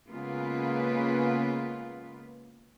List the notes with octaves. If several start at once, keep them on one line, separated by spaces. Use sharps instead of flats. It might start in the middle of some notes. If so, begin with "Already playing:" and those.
C#3 G#3 A#3 B3 F4 B4